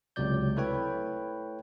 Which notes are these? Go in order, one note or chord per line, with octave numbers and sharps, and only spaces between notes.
C#2 C3 F#3 D5 G6
A3 E4 A4 B4 C#5 G5